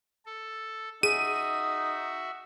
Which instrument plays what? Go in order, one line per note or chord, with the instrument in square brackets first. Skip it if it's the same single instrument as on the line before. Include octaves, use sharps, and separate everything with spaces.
[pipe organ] A4
[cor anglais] D#4 [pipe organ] F#4 E5 [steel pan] G#4 [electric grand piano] D#7